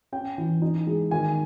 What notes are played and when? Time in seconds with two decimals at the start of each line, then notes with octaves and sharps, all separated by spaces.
0.12 C#4 G5
0.38 E3
0.62 D#4
0.87 G#3
1.11 D#3 G#5